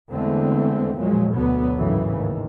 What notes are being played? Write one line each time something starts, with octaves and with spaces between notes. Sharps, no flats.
E2 D3 G#3 A3 C4
A#2 F3 F#3 G#3
D2 B2 D3 F#3 B3
G#1 F#2 A2 C#3 E3
D#2